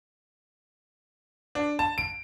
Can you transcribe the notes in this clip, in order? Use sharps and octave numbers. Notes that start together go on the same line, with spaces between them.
D4
A5
D7